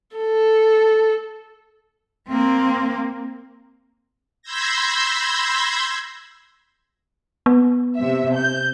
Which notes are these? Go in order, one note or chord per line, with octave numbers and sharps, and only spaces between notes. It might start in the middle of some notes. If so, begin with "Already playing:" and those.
A4
A#3 C4
B5 C6 E6 G6 G#6 A#6
B3
C3 E5
G6